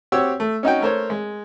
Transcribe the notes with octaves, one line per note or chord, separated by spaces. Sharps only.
C4 F#4 G4 C#5 E6
A3
C#4 D#4 F#4 G5
A3 A#4 C5 C#5
G#3